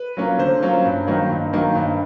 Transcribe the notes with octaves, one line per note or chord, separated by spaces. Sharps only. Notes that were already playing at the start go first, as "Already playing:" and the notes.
Already playing: B4
F#3 A#3 C#4 F4
D3 C5
F#3 A#3 C#4 F4
G2
D#3 F#3 A#3 D#4
G2
D#3 F#3 A#3 D#4
G2